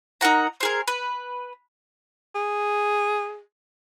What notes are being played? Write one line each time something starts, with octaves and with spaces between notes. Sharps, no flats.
D#4 A#4 F#5 A#5
C4 G#4 A#4
B4
G#4